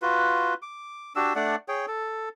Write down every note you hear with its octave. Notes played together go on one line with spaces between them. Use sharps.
F4 F#4 B4
D6
D4 F#4 G4 E6
A3 D4 D5 F#5
G#4 C#5 G5
A4